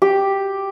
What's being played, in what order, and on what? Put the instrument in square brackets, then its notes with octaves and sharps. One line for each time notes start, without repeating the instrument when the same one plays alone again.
[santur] G4